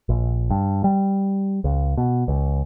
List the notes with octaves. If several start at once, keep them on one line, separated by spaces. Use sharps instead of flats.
A#1
G2
G3
C#2
B2
C#2